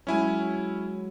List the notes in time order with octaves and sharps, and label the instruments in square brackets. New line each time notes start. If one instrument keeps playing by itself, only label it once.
[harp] F#3 G#3 [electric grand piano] C#4 E4 G#5